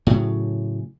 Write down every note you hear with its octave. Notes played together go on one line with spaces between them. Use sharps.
A2 C#3 F#3